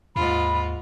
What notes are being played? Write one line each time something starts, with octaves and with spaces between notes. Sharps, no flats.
D#2 G#2 F4 B5